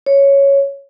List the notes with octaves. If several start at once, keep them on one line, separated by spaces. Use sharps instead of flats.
C#5